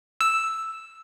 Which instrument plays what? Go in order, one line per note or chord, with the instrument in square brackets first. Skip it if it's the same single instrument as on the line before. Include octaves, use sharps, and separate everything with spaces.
[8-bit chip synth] E6